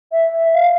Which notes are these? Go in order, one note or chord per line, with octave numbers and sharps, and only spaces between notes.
E5
F5